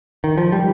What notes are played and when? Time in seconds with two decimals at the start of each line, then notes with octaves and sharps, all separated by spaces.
0.24 D#3
0.38 F3
0.52 G3